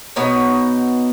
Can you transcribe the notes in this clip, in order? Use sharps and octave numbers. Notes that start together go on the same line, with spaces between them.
B2 B3 D#4 C#5